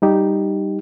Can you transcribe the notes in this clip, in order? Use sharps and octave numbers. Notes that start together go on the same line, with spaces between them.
G3 D#4 G4